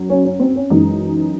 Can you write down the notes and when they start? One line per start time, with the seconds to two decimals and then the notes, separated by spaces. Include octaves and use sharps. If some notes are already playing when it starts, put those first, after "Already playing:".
Already playing: F#2 F#3
0.10 C#4
0.25 C#4
0.39 C4
0.56 C#4
0.70 F#2 E3 G#3 D#4